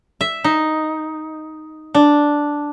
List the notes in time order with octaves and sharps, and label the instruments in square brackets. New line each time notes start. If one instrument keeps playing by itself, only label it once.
[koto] E5
D#4
D4